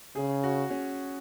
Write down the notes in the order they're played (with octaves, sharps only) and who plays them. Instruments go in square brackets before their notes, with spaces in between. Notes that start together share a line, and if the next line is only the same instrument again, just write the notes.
[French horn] C#3 [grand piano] G#4
[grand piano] F#4
C#4